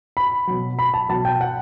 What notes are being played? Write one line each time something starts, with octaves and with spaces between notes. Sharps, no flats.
B5
B2 F#3
B5
A5
B2 F#3 A5
G5
F#5